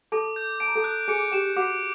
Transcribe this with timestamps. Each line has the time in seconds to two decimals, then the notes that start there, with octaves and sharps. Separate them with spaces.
0.12 A4 A5 D6
0.36 G6
0.60 A5 D7
0.68 A#5
0.75 A4 A5
0.84 F#6
1.08 G#4 G#5 C#7
1.32 G4 G5 E7
1.56 F#4 F#5 D6